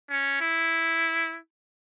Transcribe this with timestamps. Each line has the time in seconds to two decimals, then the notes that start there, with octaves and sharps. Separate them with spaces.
0.10 C#4
0.41 E4